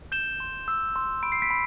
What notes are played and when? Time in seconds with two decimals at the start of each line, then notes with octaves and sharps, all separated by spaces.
0.12 G6 E7 G7
0.40 C6
0.68 E6
0.96 C6
1.23 B5 D7
1.32 C7
1.42 B6 D7
1.50 B5